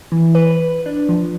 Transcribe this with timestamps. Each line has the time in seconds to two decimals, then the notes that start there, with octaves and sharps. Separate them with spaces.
0.12 E3
0.35 B4
0.86 D4
1.09 F3